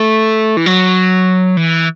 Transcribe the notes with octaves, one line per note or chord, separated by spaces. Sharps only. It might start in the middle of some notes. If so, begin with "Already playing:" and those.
Already playing: A3
E3
F#3
E3